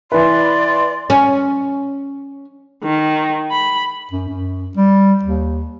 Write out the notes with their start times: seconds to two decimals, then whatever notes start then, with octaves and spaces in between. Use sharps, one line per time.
0.12 E3 B4 D5 C6
1.10 C#4
2.84 D#3
3.51 B5
4.12 F#2
4.28 F#2
4.77 G3
5.23 D#2